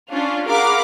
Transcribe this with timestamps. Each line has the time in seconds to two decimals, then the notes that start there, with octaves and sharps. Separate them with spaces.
0.11 C#4 D4 F4
0.48 G#4 A#4 F5 F#5 B5 D6